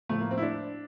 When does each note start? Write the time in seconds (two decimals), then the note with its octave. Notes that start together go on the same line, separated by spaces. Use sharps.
0.09 A2 F3 A3
0.21 A#3
0.31 C4
0.37 E4
0.42 D4